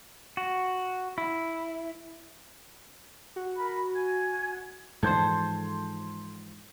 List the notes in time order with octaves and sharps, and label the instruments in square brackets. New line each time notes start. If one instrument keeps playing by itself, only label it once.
[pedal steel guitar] F#4
E4
[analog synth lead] F#4
[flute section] A#4 B5
G#5 G#6
[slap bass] G#2 E3 F3 [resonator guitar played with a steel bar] A4 C5 [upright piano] C6 G6 G#6